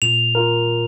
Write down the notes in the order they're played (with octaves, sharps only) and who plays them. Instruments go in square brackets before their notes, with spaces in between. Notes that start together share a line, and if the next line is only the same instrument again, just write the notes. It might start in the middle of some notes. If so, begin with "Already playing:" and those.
[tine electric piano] A#2 [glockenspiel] F7
[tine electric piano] F4 A#4